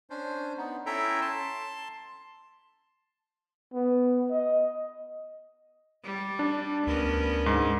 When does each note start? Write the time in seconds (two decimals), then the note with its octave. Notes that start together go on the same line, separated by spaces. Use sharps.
0.10 C#4 D4 C5
0.57 B3 D#4
0.86 C#4 E4 A4 E5 G5 A#5
1.21 A5 C6
3.74 B3
4.31 D#5
6.04 G3
6.39 D4
6.87 D2 B3 C#4 A#4
7.46 G#2